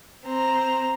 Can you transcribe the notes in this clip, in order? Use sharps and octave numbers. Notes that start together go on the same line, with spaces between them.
C4 A#5